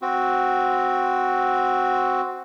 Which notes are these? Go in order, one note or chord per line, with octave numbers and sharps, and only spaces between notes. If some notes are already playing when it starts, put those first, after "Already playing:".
C4 F#4